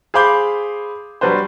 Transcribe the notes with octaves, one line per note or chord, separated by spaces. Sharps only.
G#4 C5 F5 B5 D6 G6
F#3 G3 D4 B4 C5